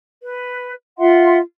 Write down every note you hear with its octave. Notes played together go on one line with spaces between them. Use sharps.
B4
F4 E5 F#5 C6